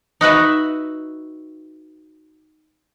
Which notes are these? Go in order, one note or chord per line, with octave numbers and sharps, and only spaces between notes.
D#4 F#4 B4 E5